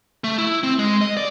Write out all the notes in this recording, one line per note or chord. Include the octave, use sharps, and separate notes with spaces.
A3
E4
C4
G#3
D#5
D5